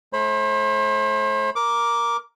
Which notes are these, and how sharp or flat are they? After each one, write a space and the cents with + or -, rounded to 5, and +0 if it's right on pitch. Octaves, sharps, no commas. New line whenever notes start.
A3 -35 C5 +40 B5 +0
A#4 +5 D6 -5